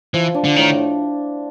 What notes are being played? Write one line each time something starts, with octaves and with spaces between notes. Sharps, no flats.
E3 F3
D4
D3
A2 D#3